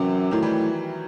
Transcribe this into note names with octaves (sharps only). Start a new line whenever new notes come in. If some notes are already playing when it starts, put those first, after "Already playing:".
Already playing: F#2 C3 E3
A2 D#3 F#3
E3 G3